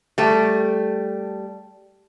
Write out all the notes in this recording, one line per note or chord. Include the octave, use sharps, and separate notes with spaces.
G3 A3